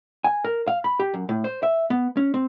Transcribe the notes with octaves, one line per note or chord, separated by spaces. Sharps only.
G#5
A#4
F5
B5
G4
F#2
A2
C5
E5
B3
C#4
C4